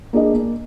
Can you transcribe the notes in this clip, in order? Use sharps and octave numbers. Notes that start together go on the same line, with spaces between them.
A#3 D4 G#4 D#5
A#3